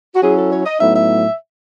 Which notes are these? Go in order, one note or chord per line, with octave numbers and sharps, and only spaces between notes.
F#4
F#3 C#4 E4 G#4
A4
C#5
D#5
A2 F#3 B3 D#4 E5
E5